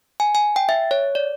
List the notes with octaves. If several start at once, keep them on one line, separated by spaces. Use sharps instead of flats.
G#5
G#5
G5
E5
C#5
D5